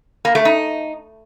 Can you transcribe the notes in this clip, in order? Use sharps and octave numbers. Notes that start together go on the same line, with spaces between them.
A#3
A3
D#4